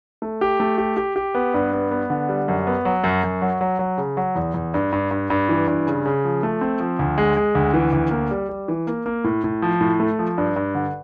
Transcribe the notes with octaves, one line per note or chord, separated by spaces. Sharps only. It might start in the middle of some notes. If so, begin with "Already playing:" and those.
A3
G4
A3
G4
G4
G4
B3
G2
B3
B3
D3
G3
F#2
B3
F#3
F#2
F#2
F#3
F#3
F#3
C#3
F#3
E2
E2
G2
G2
G2
G2
E3
G2
C#3
C#3
F3
A3
C4
F3
D2
G#3
G#3
D2
E3
D2
A#3
G3
G3
E3
A#3
A#3
A2
A2
F3
A2
A3
F3
G2
G2
D3